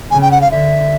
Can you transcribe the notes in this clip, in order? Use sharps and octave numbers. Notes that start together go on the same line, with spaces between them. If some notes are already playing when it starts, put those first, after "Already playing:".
C#3 G#5
G5
F#5
F5
D3 E5